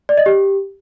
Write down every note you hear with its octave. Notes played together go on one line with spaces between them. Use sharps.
D5
D#5
G4